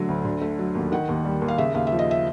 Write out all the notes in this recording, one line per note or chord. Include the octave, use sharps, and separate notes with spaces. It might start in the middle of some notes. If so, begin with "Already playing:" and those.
Already playing: D3 F#3 A3
D2
D3
A3
F#3
D#2
D#3 F#5
D#2
G3
D#2
F5
C#3 E5
D#2 F5
E5
F3
D#5
E5